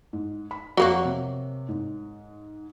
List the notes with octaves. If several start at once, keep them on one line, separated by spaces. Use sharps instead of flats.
G#2
B5
F2 F#3 A#3 F#4
C3
G#2